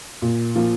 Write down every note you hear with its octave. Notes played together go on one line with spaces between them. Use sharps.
A#2
F3 A#3 F4